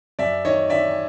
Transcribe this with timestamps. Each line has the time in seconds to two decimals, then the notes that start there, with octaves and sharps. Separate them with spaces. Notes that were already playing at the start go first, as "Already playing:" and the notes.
0.19 F#2 D5 E5
0.45 D#3 C#5 D#5
0.70 D#3 D5 E5